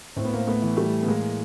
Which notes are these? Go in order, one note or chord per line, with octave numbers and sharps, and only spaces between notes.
A2 C4
B3
A#3 C4
A3 B3
E3
G3 A3
B3
A2 G#3 A#3